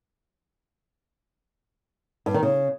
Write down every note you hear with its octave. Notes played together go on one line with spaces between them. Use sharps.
G2
D#3
C#3